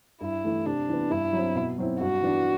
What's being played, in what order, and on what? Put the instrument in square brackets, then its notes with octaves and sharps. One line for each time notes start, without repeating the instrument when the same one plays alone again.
[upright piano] G2 [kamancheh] E4
[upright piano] E3 A3
[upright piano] C3 [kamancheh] D4
[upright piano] E3 B3
[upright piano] G2 [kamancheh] E4
[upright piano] F#3
C4
B2
F#3 C4 E4
[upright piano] G2 [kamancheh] F#4
[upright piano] E3 B3 D4